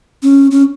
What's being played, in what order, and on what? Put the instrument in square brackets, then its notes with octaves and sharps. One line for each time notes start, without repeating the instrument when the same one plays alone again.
[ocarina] C#4
C#4